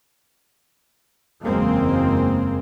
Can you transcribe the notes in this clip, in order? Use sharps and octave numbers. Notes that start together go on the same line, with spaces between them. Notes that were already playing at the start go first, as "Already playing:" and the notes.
F#1 E2 G#3 A#3 C4